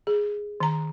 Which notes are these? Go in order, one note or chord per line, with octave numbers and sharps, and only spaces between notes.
G#4
D#3 A#5